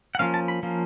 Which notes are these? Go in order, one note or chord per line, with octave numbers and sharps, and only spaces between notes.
F#5
F3 A#3 C#4 F5
A5
B5
F3 A#3 C#4